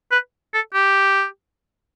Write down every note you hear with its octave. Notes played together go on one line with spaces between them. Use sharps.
B4
A4
G4